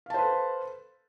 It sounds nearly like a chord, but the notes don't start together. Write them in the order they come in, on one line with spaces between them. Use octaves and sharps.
F5 A5 C5 B4 A4